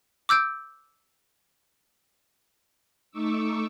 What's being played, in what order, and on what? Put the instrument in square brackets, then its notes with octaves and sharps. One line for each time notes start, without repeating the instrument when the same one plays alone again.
[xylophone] D6 E6 G6 D7
[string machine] A3 D#4 C#6 D6 E6